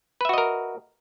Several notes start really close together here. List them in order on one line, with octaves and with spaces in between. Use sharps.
B4 E5 F#4 D#5 A#4